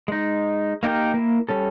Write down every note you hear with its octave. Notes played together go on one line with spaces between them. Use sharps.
G#3 D#4
A#3 D#4 G4 A#4 G5
A#3 E4
G3 C#4 A4